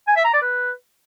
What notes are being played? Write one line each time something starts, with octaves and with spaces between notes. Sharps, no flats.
G#5
E5
A#5
D5
B4